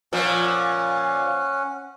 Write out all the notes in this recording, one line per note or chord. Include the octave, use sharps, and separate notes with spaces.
A#2 F3 C#4 F#5